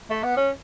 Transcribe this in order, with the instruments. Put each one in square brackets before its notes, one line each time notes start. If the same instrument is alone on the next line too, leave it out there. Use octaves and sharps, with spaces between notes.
[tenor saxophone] A3
B3
C#4